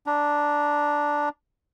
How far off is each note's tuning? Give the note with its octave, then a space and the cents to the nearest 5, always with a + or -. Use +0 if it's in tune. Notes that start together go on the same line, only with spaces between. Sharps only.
D4 +0 A#5 +20